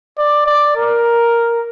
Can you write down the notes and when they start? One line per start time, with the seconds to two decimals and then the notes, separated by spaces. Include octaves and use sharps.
0.18 D5
0.47 D5
0.76 A#4